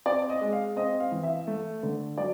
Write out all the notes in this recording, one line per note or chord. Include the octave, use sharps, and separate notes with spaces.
C4 D5
D#5
G#3
F5
C4 D#5
F5
E3
E5
A3
D3
F#3 D5